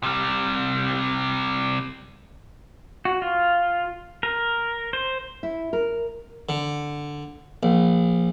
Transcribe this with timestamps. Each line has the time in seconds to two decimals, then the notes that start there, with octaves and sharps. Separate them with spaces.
0.03 C3 G3
3.05 F#4
3.22 F4
4.23 A#4
4.93 C5
5.43 E4
5.73 A#4
6.49 D3
7.63 A#1